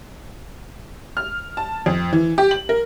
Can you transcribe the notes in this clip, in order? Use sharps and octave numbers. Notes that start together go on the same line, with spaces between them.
F6
A5
F2
E3
G4
F#7
A#4